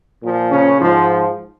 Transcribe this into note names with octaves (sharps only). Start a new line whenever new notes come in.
A#2 F3
C#3 C#4
G#2 F3